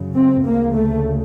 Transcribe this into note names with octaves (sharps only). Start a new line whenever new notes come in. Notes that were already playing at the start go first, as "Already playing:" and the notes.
Already playing: F#2 C#3
C4
D2 C#3 A#3
A3